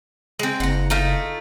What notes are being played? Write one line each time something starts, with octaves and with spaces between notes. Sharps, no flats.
G#3 C4
F#1 F#5 A#5
A3 D#4 F4